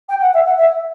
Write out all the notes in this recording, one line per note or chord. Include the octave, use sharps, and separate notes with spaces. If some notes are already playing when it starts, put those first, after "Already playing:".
G5
F#5
E5
F#5
E5